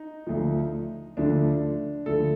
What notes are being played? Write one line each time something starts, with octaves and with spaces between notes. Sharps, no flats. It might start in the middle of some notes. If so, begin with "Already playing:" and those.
Already playing: D#4
D2 D3 F3
D2 D3 F3 D4
D2 D3 F3 A4